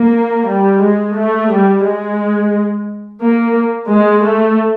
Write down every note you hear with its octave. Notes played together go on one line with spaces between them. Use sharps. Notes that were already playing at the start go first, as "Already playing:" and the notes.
Already playing: A#3
G3
G#3
A3
G3
G#3
A#3
G#3
A3